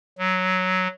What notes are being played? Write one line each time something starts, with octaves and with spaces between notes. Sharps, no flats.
F#3